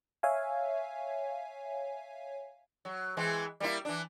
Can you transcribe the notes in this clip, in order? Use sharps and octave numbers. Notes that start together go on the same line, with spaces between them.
C#5 E5 F5 G#5
F#3
E3 G#3 C4
G3 A#3 E4
E3 D4